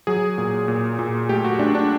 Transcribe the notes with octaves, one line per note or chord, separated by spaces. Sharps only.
F#3 G#4
A#2
A#2
A#2
A3 G4
F#4
A3 D4
D4